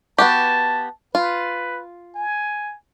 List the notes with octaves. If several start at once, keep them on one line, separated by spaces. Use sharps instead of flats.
B3 F#4 G4 A5
F4 B4
G#5